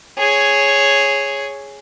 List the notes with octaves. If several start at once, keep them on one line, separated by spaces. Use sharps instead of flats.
G#4 C#5